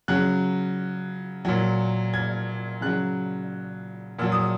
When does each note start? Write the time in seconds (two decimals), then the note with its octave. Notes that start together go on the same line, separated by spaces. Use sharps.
0.08 C#3 F#3 F#6
1.45 A#2 F#3
2.14 G#6
2.81 C#3 F#3 F#6
4.19 A#2 F#3 E6
4.32 D#6